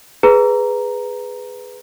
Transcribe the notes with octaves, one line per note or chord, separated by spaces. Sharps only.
G#4 B4 A#5